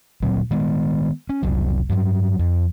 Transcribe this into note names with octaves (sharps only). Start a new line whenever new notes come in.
D2 A#2 F#3 C4
D#3 G#3 B3
C#4
F1 C2 F#3
G2 F#3
F2